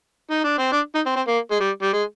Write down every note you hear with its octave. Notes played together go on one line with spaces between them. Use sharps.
D#4
D4
C4
D4
D#4
C4
C4
A#3
G#3
G3
G3
G#3